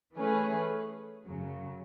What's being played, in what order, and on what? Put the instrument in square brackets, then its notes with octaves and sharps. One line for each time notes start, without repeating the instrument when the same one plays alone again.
[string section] E3 A3 C#4 G#4 B4
F#2 C#3 F#3